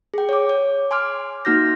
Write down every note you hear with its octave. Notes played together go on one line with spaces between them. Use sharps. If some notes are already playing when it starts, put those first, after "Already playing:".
G#4 G5
C#5 D6
C#5
G#5 C6 D6 F6
A#3 D#4 F#4 F6 G6 A#6